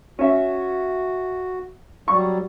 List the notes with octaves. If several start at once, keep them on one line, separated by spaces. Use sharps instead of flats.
C#4 F#4 E5
F#3 G3 C#6